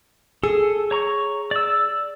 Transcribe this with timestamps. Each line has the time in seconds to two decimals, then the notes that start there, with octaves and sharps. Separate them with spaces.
0.44 G#4 A4
0.91 C#5 A#5 C#6
1.51 D5 E6